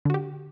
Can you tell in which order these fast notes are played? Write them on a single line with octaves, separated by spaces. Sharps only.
D3 F#4 G4